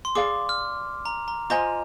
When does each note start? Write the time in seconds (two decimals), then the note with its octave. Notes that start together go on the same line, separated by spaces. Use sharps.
0.05 C6
0.15 G#4 D5 F5 D6
0.49 F6
1.05 A#5
1.28 A#5
1.50 F4 C5 D#5 G#5 A#5